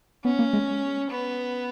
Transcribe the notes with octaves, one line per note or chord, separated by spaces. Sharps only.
B3 C#4
A#3
G#3
B3